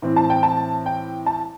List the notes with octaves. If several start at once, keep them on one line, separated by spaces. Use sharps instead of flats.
A2 E3 C4
A5
G5
A5
G5
A5